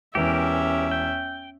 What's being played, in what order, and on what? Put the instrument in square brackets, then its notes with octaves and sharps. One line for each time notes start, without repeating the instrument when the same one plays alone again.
[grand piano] E1 E3 [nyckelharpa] C#4 E5 [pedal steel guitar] G4 A#4
[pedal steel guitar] G5